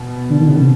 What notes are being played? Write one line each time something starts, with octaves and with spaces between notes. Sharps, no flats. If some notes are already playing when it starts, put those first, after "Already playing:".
Already playing: B2
D3
D#3
C#3
C3